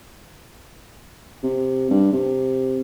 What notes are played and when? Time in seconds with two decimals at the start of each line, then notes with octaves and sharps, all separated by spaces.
1.43 C3
1.90 G2
2.12 C3